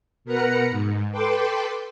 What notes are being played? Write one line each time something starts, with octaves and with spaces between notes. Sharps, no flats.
B2 A#4 B4 F#5 A#5 C#7
G#2
A4 B4 G5 C6 D6